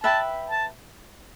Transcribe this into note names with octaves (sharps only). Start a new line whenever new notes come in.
B4 E5 G5 A5 B5
A5